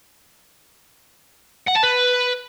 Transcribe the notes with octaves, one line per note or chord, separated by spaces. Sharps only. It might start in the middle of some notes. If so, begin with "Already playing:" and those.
F#5
A5
B4